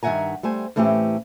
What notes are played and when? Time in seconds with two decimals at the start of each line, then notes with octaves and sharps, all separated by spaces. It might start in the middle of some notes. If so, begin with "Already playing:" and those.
0.03 G2 D#3 E5 F#5 G#5 A#5
0.43 G3 A3 C5 G#5
0.76 A2 E3 A3 C4 C#4 G4